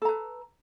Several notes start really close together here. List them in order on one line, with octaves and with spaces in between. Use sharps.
A4 A#5 B4